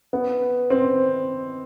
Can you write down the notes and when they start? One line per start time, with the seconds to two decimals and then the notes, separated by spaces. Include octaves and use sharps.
0.13 B3
0.70 C4